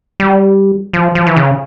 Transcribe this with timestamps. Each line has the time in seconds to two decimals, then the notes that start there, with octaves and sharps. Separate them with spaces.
0.20 G3
0.93 F3
1.15 F3
1.26 E3
1.36 C#3